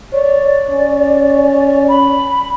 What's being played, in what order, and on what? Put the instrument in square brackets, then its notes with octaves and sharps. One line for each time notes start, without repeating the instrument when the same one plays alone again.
[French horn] C#5 [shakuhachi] D5
[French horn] C#4
[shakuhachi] B5